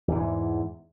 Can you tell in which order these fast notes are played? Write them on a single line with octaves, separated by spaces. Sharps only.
E2 E3 G#2